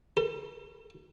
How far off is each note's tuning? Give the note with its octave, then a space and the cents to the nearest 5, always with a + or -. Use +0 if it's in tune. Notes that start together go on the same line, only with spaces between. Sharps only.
A4 +35